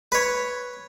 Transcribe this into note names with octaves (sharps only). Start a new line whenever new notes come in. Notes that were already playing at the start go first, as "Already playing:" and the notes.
B4 C#5